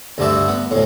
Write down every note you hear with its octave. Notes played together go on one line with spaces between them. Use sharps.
D2 G2 D3 D5 E5
B3
D2 A2